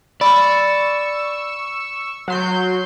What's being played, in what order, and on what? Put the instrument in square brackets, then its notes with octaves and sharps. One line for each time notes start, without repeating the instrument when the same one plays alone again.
[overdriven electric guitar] D5 [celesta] B5 [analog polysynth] C#6 E6
[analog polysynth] F#3 C6 G6